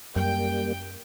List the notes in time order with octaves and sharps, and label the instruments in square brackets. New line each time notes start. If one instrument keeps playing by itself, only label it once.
[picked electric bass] F#2 [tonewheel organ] G3 A#3 [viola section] G5